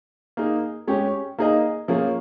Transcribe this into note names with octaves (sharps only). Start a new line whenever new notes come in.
A#3 D#4 G#4
G#3 C#4 G4
A#3 D#4 G#4 D#5
F3 A#3 C#4 G#4